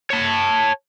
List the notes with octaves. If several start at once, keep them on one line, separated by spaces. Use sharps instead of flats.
C#5 A5